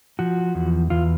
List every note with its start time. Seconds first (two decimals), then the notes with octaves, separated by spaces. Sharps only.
0.19 F3 F#4
0.55 E2
0.90 E2 F4